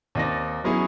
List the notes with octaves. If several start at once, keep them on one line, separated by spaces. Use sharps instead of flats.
D#2 C4 D#4 D5 A#6
F#3 B3 C#4 D#4 E4 G#4